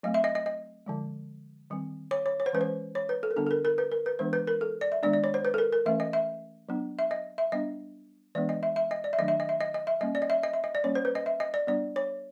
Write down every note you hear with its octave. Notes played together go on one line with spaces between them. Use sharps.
F#3 A3 C4 D#5
E5
D#5
D#5
D#5
D3 F3 G#3
D#3 G3 C4
C#5
C#5
C#5
C5
E3 G#3 C#4 B4
C5
C#5
B4
A4
A#4
D3 G3 B3 D4 A4
A4
A#4
A#4
B4
A#4
B4
E3 G#3 B3 D4 C5
B4
A#4
A4
D5
E5
D#3 G#3 B3 D4 D5
D5
C#5
C5
B4
A4
A#4
A#4
E3 A3 C#4 E5
D#5
E5
F#3 B3 D4
E5
D#5
E5
G3 B3 D4 D#5
E3 G#3 B3 D4 D5
D#5
E5
E5
D#5
D5
E5
D#3 F#3 A3 D4 D#5
E5
D#5
E5
D#5
D#5
E5
G3 A#3 C#4 D#5
D5
D#5
E5
D#5
E5
D#5
D5
G3 A#3 C#4 C#5
C5
B4
D#5
E5
D#5
D5
G3 B3 D4 D5
C#5